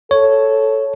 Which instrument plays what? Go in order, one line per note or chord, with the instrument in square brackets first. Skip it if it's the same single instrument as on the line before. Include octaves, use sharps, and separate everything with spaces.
[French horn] A4 [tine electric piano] C#5